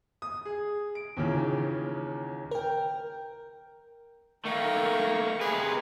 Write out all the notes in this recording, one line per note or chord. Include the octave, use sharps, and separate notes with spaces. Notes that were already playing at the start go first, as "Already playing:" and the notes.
D#6
G#4
D7
D#2 A#2 C#3 E3
A#4 G5
D#3 A3 A#3 A#4 C#6
C3 G#4 B4